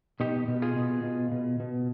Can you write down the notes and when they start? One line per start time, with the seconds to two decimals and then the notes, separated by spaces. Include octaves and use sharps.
0.20 B2 D#4 G4
0.48 B2
0.62 F4 G#4
0.76 B2
1.04 B2
1.32 B2
1.60 B2